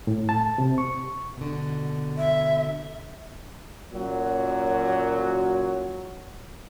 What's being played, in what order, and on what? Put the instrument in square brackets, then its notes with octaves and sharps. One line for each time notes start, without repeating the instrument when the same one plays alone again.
[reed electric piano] A2
A5
C3
C#6
[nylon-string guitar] B2 D3
[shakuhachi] E5
[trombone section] F#2 A#2 F#3